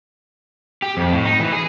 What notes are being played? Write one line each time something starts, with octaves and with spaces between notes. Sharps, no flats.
G4
F2
A2
D#4
E3
G#4